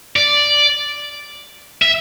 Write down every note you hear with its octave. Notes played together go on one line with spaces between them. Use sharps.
D5
E5